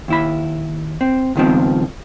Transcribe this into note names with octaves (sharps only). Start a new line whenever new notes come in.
D#2 E4 B5
C4
C#2 G2 D#3 F3 B3 C4